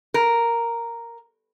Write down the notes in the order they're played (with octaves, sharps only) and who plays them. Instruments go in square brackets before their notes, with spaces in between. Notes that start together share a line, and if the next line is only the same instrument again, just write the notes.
[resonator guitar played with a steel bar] A#4